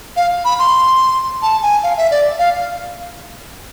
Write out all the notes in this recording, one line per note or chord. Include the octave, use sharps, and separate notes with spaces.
F5
B5
C6
A5
G#5
F5
E5
D5
F5